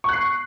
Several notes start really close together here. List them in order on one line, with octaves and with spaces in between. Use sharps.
C#6 F#6 C7